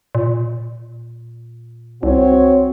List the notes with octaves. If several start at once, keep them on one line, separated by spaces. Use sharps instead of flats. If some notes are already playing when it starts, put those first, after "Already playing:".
A#2
C2 C4 F#4 C#5